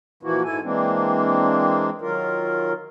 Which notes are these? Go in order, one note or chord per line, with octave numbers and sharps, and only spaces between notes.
A#2 E3 F3 A#3 E4 F#4
G#2 E4 A4 G#5
E3 G#3 A#3 C4 D4
D#3 F#3 F4 A#4